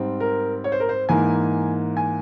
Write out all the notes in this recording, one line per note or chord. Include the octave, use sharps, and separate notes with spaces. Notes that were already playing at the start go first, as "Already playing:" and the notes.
Already playing: G#2 G3 C4
A#4
C#5
C5
A#4
C5
G#2 E3 A#3 G#5
G#5